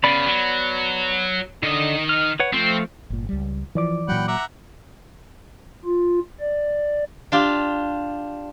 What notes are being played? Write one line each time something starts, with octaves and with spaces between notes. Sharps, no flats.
C#3 B3 D5 B5
F#3
D3 D#3 D#5
F6
B4 C#5 F#5
F3 A3 C4 F4
G1 A#2
C#2 G3
E3 F3 D5 D6
A#2 F#3 F#5 G5 B5
E5 F#5 A#5 D6
F4
D5
D4 F4 G4